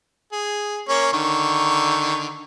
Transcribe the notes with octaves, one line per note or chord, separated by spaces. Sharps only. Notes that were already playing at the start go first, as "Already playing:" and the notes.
G#4
A#3 C#4 C#5
D3 D#3 C#6